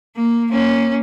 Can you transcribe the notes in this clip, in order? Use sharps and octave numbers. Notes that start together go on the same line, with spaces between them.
A#3
A#3 C#4